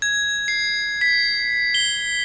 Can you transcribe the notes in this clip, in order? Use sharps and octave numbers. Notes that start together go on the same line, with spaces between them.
G#6
C7
B6
G7